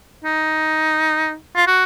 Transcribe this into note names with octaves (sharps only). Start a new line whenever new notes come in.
D#4
F4
F#4